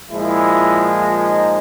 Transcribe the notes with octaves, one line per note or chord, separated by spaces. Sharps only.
A#2 F3 G#3 E4
D#4